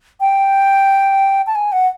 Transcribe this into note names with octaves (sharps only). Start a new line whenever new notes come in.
G5
A5
G#5
F#5